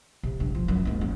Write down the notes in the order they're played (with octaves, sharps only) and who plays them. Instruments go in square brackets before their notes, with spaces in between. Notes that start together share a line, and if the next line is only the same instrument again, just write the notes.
[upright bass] C3
G2
F3
F#2
D#2 G#2
F#1